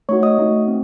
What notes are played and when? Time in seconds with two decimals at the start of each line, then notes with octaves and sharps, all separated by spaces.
0.09 A3 D#4 F#4 C#5 C#6
0.23 D#5 D#6
0.38 A3 D#4 F#4
0.68 C4